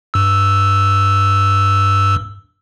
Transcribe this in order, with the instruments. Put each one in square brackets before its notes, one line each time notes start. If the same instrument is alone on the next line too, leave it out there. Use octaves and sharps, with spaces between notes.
[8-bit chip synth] G2 E6